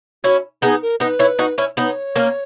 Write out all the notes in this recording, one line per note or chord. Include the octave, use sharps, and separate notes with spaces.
C#4 E4 F#4
B3 D#4 G#4
A#4
B3 D#4 B4
C#4 E4
D#4 F#4
C#4 E4
B3 D#4 C#5
A#3 C#4